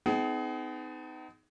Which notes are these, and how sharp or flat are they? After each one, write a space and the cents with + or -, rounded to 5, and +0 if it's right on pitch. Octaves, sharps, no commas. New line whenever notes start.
B3 +45 D#4 +0 G#4 +20